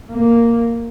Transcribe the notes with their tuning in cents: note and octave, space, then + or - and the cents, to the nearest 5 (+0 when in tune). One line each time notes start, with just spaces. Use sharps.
A#3 -5